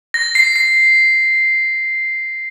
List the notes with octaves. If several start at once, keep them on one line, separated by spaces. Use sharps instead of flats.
A#6
C7
C7